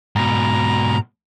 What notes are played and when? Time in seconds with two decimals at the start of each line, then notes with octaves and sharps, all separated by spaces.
0.16 G#2 B2 A#5